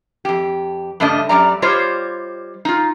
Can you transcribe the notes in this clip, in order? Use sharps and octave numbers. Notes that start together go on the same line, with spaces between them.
F2 G4
G2 C#3 A3 D4 D#5
F#2 G3 D5 A#5
G3 F4 G4 C5 C#5 D#5
D#4 F4